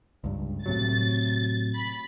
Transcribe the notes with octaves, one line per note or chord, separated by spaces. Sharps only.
C#2 G2
A2 C3 F#3 A6
B5